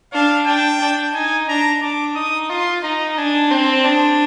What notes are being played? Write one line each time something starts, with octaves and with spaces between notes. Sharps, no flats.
D4 F5
D4 G5
D4
D#4 G#5
D4 A#5
D4 D6
D#4 D#6
F4 C6
D#4 A#5
D4 G#5
C4 G5
D4 G#4